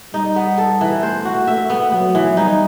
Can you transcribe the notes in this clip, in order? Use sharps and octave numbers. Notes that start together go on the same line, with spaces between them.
G3 D#4
B3
A4
E3
A3 C5
F#4
A3 E5
B3
F#3 B3
E3
G3 D#4